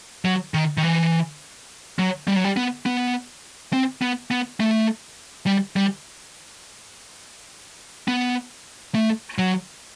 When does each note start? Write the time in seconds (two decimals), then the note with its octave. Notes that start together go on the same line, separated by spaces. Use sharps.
0.25 F#3
0.54 D#3
0.77 D#3
0.83 E3
1.99 F#3
2.28 G3
2.36 F#3
2.44 G3
2.57 B3
2.86 B3
3.73 C4
4.02 B3
4.31 B3
4.60 A3
5.47 G3
5.76 G3
8.08 B3
8.95 A3
9.38 F#3